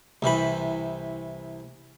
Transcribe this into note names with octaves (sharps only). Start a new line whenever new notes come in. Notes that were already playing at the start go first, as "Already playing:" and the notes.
C2 C3 E3 B5